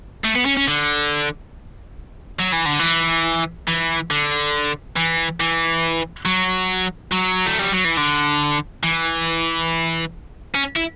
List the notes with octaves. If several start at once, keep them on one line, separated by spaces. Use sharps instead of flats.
A3
B3
C#4
C#4
D3
F#3
E3
D3
E3
E3
D3
E3
E3
F#3
F#3
A3
G3
F#3
E3
D3
E3
C#4
E4